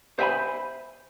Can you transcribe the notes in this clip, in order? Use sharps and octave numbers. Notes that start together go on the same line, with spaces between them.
C5 E5 G5 G#5 B5